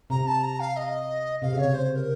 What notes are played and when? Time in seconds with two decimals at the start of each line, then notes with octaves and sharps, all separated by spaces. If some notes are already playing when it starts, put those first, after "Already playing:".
0.10 C3 A#5
0.27 A5
0.43 A#5
0.60 F5
0.76 D#5
1.42 C3 F5
1.53 C#3
1.58 C#5
1.64 C3
1.74 C5
1.92 C5
1.96 A#4